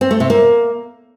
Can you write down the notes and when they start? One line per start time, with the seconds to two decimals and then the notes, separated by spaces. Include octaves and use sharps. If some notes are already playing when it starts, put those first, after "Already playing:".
0.01 C4
0.11 A3
0.20 C3
0.30 A#3